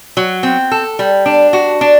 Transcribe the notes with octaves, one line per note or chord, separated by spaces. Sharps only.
F#3
C4
A4
G3
D4
F#4
D4